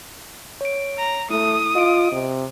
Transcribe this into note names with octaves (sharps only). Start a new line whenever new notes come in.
C#5 D7
A#5
A3 E4 D#6
F4 D#5 D7
C3